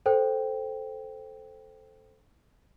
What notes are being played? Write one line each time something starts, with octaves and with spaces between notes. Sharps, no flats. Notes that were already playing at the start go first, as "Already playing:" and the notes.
A4 C5 G5